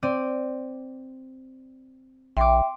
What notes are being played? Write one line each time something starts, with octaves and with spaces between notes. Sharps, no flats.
C4 D5 D#7
A#1 E5 G5 C6 D6